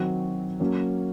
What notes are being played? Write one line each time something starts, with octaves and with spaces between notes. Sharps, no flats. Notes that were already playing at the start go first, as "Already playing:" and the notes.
Already playing: D#3 F#3 C4 F#4
F#3 A#3 C#4